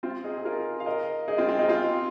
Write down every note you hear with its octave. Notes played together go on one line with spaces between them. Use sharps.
C4 F4
D#4 G#4
G#4
F4 A#4
F5
A#4 D#5
D#4 G#4
C4 F4
C4 F4
D#4 G#4
C4 F4